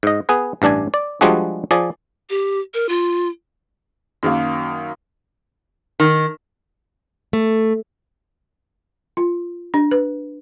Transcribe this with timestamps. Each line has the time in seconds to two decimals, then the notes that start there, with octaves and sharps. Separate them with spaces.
0.03 G#2 D#5
0.29 B3 G#4 B4
0.62 A1 G2 D4 D5 G#5
0.94 D5
1.21 F3 G3 G#3 D4 F#4 G#4
1.71 F3 G#4 D5
2.30 G4
2.74 A#4
2.89 F4
4.23 F#2 D#3 F#3 A#3
6.00 D#3
7.33 A3
9.17 F4
9.74 D4
9.91 B4